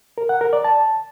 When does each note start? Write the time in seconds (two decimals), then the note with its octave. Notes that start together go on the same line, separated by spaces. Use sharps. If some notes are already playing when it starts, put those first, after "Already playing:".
0.18 A#4
0.29 F#5
0.41 A#4
0.53 D5
0.64 A5